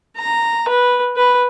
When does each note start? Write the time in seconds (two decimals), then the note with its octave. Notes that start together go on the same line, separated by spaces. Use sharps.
0.17 A#5
0.69 B4
1.17 B4